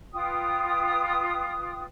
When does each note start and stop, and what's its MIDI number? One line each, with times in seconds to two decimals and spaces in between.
0.13 1.84 65
0.13 1.84 71
0.13 1.84 79
0.13 1.84 87